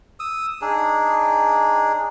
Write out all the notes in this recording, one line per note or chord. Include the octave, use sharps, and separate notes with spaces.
D#6 E6
D4 D#4 G#4